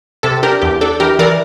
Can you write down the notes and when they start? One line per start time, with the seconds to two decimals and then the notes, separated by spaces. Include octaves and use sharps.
0.23 C3 A4
0.43 D4 G4 A#4
0.61 E2 G4
0.81 D4 A4
1.00 E3 G4 A#4
1.19 E3 A#4 D5